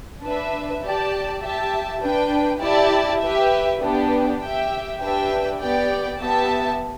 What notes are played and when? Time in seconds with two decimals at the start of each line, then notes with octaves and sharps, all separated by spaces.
0.24 D4 B4 E5
0.84 G4 D5 A5
1.43 G4 E5 A5
2.03 D4 B4 G5
2.62 E4 G4 D5 A5
3.21 G4 B4 E5
3.82 B3 D4 G4
4.41 G4 E5 G5
5.01 D4 G4 B4 E5 G5
5.61 B3 G4 D5 G5
6.20 B3 G4 E5 A5